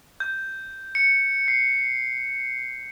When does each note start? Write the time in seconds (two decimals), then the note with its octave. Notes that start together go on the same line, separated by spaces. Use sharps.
0.20 G6
0.95 C#7
1.48 C7